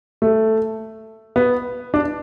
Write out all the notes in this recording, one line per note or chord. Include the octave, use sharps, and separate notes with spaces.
A3
B3
D4